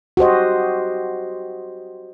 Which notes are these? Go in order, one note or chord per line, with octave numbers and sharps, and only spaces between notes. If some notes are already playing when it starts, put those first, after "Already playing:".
F#4 G4 C5 D#5